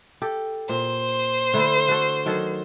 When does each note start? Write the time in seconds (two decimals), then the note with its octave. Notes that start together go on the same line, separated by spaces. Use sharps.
0.22 G4 A4
0.69 A#2 C5
1.54 D3 A3 E4
1.88 F#4 A4
2.26 D#3 F#3 A4